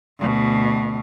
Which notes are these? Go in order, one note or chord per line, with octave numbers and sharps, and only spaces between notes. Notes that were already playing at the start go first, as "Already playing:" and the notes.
D2 B2